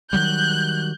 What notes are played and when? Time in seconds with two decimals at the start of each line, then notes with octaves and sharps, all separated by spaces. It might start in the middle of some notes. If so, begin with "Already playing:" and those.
0.13 D#3 F#3 G3 F#6 G6